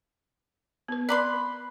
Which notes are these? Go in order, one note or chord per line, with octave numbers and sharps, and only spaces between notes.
B3 B4
B4 D5 B5 C6 D6